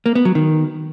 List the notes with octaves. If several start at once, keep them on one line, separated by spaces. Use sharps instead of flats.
A#3
B3
F#3
D#3